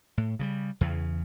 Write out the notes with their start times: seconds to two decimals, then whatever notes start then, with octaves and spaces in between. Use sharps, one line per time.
0.18 A2
0.39 C#3 F#3 G3
0.81 E2 C#3